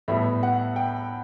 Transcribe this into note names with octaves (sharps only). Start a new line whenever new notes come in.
A2 G3 B3 E4 E5
F#5
G5